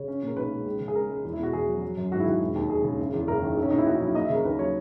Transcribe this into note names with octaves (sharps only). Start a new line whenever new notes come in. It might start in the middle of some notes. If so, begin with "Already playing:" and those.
Already playing: C#3 C#5
C#4
A#2 A#4
B1 B4
G#3
C#2
C#3
G#4
C#2 A#4
G#3
E2
E4
B2 F#4
E2 G#4
F#3
F#3
F#2
G#1 F#4
E4
D#3 F#4
E1
D#2
E1 G#4
C#3
F#1
E2
F#1 A#4
D#3
B1
C#4
A#2 D#4
E4
B1 F#4
F#3 E4
A#3 D#5
E5
C#3
A#4
D#2 B4
F#3 C#5